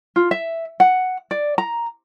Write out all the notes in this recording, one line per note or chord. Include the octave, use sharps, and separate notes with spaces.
F4
E5
F#5
D5
A#5